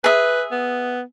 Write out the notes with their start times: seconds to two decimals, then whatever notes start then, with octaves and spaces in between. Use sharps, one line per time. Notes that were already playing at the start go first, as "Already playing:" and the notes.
0.04 G#4 B4 E5
0.52 B3